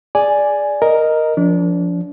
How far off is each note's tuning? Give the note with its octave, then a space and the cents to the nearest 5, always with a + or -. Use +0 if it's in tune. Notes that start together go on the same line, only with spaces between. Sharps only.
G#4 +0 D5 +0 G#5 +0
A#4 +0 D#5 +0
F3 +0 D4 -30